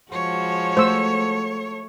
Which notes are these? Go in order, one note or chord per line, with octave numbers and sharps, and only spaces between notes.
F3 G#3 F#4 C#5
A3 C5 E6